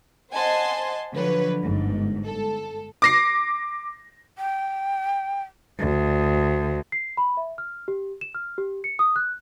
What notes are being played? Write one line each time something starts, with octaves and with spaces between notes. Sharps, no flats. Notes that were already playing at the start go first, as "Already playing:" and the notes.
C5 D#5 F#5 G#5 A5 C6
D3 F3 F#3 B4 C#5
G1 G#2
A4
D6 A#6 C7
G5
D2
C7
B5
E5
F6
G4
E7
F6
G4
C#7
D#6
F#6